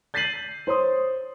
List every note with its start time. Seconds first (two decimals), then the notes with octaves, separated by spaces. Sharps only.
0.14 G6 A6 B6 C7 D#7 F#7
0.67 C5 C#5 C6 D#6